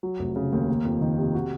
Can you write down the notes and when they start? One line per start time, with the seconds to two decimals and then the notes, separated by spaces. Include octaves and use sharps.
0.03 F#3
0.19 F1
0.36 C#3
0.52 D#2
0.69 A#3
0.85 F2
1.01 D#3
1.18 C3
1.34 F#4